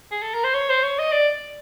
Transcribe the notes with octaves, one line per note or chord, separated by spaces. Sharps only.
G#4
A4
A#4
C5
C#5
C5
C#5
D#5
D5